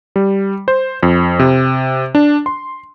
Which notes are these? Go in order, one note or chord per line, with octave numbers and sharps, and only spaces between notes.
G3
C5
F2
C3
D4
C6